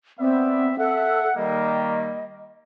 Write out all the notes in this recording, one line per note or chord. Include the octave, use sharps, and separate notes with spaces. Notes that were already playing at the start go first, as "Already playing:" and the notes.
B3 C4 D5 E5
A4 E5 F#5
D#3 G3 A#3 D#5